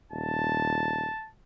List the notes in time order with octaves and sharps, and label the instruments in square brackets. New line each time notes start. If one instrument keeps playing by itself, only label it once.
[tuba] D#1 [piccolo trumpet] A5